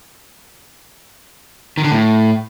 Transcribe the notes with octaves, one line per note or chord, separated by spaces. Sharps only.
D#3
D3
A2